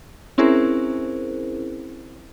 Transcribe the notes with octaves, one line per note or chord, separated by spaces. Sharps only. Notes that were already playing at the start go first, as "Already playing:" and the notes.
C4 C#4 E4 G#4 A#4 C5